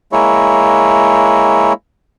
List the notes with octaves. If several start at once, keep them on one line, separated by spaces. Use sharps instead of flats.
G#3 A#3 E4 C#5